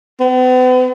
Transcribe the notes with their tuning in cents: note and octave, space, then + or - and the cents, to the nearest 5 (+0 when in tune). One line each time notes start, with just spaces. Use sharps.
B3 +45